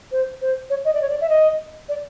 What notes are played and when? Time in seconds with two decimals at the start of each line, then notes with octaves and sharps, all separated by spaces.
0.12 C5
0.41 C5
0.70 C#5
0.85 D#5
0.93 D5
1.01 C#5
1.09 D5
1.21 E5
1.29 D#5
1.89 D5